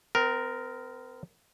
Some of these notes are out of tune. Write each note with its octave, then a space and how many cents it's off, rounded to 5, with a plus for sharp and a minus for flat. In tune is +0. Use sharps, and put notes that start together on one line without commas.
C4 -40 A#4 +0